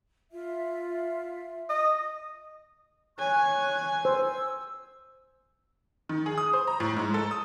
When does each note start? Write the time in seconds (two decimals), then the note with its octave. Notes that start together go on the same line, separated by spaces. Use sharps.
0.32 F4 E5
1.69 D#5
3.19 C#5 G#5 C#6 F#6
4.05 C5 E6
6.09 D#3
6.26 G#4
6.38 D#6
6.53 C5
6.67 A#5
6.80 A2
6.97 G#2
7.14 A4
7.31 D#6